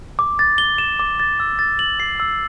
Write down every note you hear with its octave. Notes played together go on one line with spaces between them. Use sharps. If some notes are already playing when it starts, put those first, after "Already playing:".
D6
A6
G7
E7
D6
A6
E6
A6
F#7
C7
E6